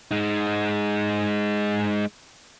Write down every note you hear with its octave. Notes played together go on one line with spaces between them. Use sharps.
G#3 D#4